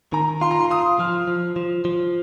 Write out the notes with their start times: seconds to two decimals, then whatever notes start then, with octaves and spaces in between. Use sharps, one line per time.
0.13 D#3 A#5
0.41 F4 C6
0.51 A#5
0.60 C6
0.71 F4 D#6
0.99 F3 F6
1.28 F3
1.56 F3
1.85 F3